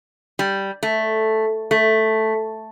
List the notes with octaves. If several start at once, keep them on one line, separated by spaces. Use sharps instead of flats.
G3
A3
A3